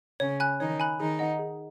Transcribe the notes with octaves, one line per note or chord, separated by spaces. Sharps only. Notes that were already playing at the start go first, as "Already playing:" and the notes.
C#3 C#4 C#5
G#5 B5 F#6
D#3 D#4 C#5
G#5 B5 F#6
D#3 D#4 G#4
D#5 F#5
G#4